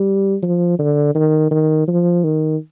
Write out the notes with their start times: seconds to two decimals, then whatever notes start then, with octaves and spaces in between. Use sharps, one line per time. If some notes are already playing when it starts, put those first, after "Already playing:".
Already playing: G3
0.43 F3
0.79 D3
1.15 D#3
1.51 D#3
1.88 F3
2.24 D#3